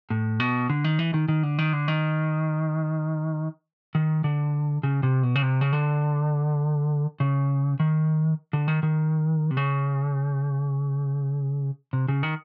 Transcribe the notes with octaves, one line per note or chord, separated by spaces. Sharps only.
A2
B2
D3
D#3
E3
D#3
D#3
D3
D#3
D3
D#3
D#3
D3
C#3
C3
B2
C#3
C3
C#3
D3
C#3
D#3
D3
D#3
D#3
C3
C#3
C3
C#3
D#3